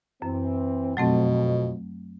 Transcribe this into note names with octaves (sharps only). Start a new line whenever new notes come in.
F#2 E3 C4
F2 B2 F#3 A3 C4